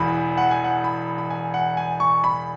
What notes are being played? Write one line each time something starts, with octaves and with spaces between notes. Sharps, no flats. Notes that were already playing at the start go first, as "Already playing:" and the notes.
Already playing: E1 E2 E3 B5
F#5
G#5
F#5
B5
B5
G#5
F#5
G#5
C#6
B5